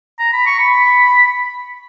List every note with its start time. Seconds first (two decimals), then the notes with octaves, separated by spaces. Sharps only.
0.19 A#5
0.33 B5
0.46 C#6
0.59 B5